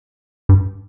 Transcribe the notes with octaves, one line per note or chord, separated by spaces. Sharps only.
G2